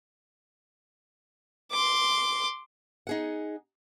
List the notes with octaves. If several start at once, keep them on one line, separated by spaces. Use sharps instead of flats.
C6 D6
D#4 G#4 F#5